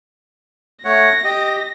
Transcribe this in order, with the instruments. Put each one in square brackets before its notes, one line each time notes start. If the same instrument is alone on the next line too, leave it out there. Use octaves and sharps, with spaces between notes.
[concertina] A3 C#5 F#5 [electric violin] A#6
[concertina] G4 D#5